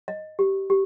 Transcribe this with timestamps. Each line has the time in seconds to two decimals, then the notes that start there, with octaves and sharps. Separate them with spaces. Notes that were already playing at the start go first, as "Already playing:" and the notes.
0.08 D#5
0.39 G4
0.70 G4